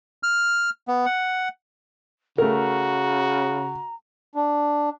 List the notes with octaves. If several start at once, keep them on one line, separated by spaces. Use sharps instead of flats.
F6
B3
F#5
C#3 A3 F#4 A#4 A#5
D4